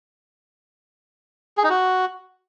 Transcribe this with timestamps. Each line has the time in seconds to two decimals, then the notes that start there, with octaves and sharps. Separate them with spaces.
1.57 G#4
1.64 D#4
1.70 F#4